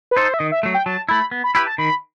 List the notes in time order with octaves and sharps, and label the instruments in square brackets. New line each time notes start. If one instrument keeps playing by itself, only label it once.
[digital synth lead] B4
[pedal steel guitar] D#4 A4 [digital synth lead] C5
[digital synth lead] E5
[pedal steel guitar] D#3 [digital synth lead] D#5
[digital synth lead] E5
[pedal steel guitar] F#3 A3
[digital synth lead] G5
[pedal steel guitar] F#3 [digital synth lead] A5
[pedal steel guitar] A3 E4 [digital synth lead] B5
[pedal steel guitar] B3
[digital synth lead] B5
[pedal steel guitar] E4 G4 B4 [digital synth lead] B5
[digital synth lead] A5
[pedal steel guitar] D#3 [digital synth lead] B5